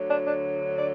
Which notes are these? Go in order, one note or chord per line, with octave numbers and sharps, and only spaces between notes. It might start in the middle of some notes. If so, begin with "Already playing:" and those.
Already playing: D2 D3 F#3
D4
D4
D5